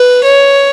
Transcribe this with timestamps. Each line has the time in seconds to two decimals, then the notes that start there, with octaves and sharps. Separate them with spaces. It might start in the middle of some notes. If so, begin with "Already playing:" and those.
Already playing: B4
0.24 C#5